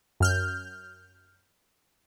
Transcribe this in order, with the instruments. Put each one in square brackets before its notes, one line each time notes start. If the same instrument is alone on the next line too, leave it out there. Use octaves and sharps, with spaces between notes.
[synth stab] F#2 F6 G6